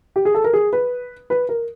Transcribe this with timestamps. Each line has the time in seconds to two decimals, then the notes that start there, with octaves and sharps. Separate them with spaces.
0.16 G4
0.25 G#4
0.34 A4
0.44 A#4
0.53 G#4
0.73 B4
1.30 B4
1.49 A#4